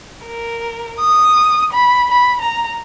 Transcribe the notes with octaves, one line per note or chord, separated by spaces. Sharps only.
A#4
D#6
B5
B5
A#5